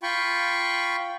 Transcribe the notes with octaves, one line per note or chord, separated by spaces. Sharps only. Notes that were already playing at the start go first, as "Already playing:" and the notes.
F4 G5 B5 C#6